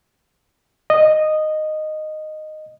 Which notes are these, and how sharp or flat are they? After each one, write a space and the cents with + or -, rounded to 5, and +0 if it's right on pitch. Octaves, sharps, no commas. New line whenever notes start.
D#5 -10